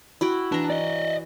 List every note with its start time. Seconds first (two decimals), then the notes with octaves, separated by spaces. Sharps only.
0.21 E4 F#4 G5
0.52 E3 D4 A#5
0.70 D5 D#5